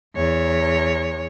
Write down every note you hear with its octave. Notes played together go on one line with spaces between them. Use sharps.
E2 C#5